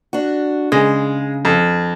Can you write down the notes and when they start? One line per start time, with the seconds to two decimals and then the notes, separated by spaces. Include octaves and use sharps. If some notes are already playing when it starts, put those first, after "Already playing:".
0.13 D4 F#4
0.72 C#3 G#3
1.45 F2